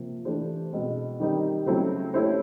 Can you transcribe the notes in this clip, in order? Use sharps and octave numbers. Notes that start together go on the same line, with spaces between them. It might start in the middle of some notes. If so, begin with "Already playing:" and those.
Already playing: C3 F3 A#3
E3 A3 D4 G4 C5
B2 G#3 C4
D#3 G3 C4 D#4 G4
C#3 F#3 A3 C4 E4
A3 C#4 E4 G4 C5